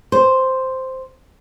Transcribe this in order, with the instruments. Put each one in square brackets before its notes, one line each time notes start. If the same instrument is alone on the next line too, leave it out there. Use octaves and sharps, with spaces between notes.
[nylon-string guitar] C5